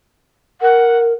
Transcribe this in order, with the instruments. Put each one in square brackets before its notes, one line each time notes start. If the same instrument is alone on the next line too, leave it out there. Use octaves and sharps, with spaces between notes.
[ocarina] A#4 [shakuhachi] F#5